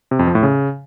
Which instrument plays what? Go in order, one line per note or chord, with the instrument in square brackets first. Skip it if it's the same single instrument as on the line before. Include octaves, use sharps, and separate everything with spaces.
[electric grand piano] C3
F2
F3
A2
C#3